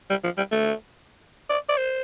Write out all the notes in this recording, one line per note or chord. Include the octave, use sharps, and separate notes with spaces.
G3
F3
G3
A3
D5
D5
C5